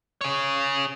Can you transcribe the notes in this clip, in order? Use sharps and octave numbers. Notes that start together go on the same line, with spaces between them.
G#4 C#5